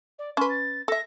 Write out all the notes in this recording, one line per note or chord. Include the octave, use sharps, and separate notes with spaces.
D5
C#4 B4 C6
A6
A4 E5 A#6